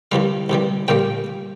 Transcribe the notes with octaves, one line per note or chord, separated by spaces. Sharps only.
C2 C3 E3 G3 F5
C2 C3 E3 G3
A#1 A#2 G3 A#3 G5